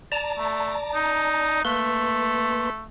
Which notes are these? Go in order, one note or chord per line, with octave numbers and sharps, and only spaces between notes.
D5 A5 A#5
A3
D#4
A3 A#3 B4 C6